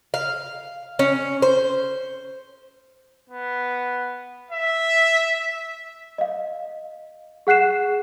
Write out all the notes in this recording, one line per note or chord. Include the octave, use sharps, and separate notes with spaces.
F5
C#4
C5
B3
E5
D#5 F5
G#4 F#5 F#6 C7 E7